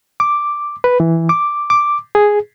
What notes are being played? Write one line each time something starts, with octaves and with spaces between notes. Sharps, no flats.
D6
B4
E3
D6
D6
G#4